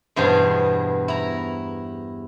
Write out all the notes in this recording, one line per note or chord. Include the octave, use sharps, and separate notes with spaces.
E2 G2 B2 G#4 C5
E4 A#5